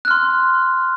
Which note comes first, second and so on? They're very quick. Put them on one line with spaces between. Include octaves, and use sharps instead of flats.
F#6 F6 C6